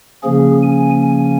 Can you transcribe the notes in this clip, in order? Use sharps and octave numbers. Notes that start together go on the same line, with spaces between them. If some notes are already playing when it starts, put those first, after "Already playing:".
C#3 F3 A#3 C#4 G#4
G#5
G#5